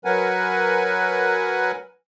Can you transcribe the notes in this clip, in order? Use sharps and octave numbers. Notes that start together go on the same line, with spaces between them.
F#3 A#4 B4 F#5 G#5